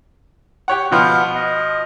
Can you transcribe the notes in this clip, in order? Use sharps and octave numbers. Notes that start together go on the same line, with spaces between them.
G4 C#5 F#5
B2 F3 B3 F4 F#5
D#5